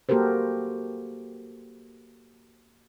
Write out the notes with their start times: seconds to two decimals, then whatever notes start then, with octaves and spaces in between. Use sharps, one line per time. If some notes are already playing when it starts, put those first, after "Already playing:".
0.09 A#3 F#4 G4 A4 A#4 C5